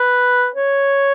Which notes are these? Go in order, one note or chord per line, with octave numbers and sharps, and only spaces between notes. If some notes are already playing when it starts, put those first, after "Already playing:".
Already playing: B4
C#5